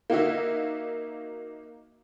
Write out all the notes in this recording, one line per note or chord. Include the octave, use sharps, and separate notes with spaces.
A#3 D#4 F#4 E5